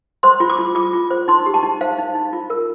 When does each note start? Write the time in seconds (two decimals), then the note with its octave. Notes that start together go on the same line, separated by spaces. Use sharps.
0.23 C5 C6
0.40 F4
0.50 D6
0.59 F4
0.75 F4 D6
0.93 F4
1.10 C5
1.28 D#4 C6
1.46 G4
1.54 A5
1.63 D#4
1.81 C5 F5
1.98 D#4
2.15 D#4
2.33 F4
2.50 A#4